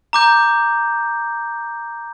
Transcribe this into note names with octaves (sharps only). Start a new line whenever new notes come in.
A#5 D6 G6